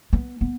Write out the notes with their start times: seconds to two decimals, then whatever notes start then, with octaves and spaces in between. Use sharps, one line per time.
0.13 B3
0.41 B3